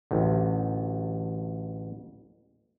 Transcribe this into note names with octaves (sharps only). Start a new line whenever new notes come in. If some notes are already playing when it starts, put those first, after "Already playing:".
A1 D2